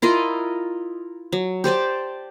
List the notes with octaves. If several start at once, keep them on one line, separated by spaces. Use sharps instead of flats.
E4 F4 A#4 D#5
F#3
G4 C5 D5 A5